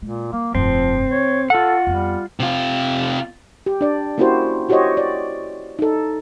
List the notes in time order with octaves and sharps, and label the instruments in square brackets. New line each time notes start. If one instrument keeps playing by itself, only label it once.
[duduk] A#2 [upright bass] G#3
[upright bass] G3 [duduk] A#3
[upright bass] F1 G2 [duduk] F3 [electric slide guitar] C4
[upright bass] C#2 [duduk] C#5
[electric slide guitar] F4 F#5 [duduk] A4
[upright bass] F2 B3 [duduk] G3
[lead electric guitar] C3 F4
[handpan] G4
D4 D5
A#3 C#4 E4 F#4 G4 C5
E4 F#4 G4 C5 C#5 D#5
D5
D#4 A4